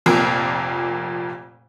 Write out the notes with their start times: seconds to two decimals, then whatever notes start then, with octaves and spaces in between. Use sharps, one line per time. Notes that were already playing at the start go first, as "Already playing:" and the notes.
0.06 F1 F2 A#2 A#3